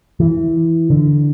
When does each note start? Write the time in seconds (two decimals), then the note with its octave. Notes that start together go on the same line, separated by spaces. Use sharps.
0.20 E3
0.90 D3